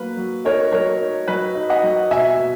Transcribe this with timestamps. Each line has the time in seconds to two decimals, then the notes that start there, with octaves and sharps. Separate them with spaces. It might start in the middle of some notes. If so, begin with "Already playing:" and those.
Already playing: F#3 A#3 B4
0.17 F#3
0.45 D#4 A#4 C#5
0.72 F#3 A#4 C#5
1.01 D#4
1.28 F#3 B4
1.55 D#4
1.70 D#5 F#5
1.83 F#3
2.11 B2 E5 G#5
2.39 B2